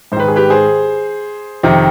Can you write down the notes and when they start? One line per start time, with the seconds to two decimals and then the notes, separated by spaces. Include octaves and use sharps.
0.12 G#2 C5
0.17 D#3 B4
0.28 G#4
0.36 G4 B4
0.50 G#4 C5
1.63 F2 C3 D#3